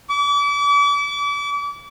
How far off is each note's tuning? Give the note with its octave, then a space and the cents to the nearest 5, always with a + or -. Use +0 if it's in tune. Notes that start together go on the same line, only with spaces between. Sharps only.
D6 -35